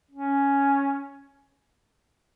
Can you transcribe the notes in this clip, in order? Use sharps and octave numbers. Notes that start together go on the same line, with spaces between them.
C#4